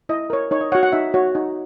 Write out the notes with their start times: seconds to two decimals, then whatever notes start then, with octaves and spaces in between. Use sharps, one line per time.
0.09 E4 D#5
0.30 A#4 C#5
0.51 D#4 C#5
0.61 D#5
0.72 C#5 F#5
0.75 F#4
0.83 F#5
0.92 D#4 E5
1.14 F#4 C#5
1.35 D#4